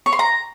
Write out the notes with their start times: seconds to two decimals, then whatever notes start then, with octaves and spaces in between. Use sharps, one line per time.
0.06 C#5
0.13 C6
0.19 A#5